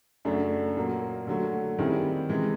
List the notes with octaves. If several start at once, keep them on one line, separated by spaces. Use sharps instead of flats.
F#2 C#3 F#3 A3 D4
A#2 F#3 A#3
D3 F#3 A3
D#3 G3 C4 E4 G#4
C3 E3 G#3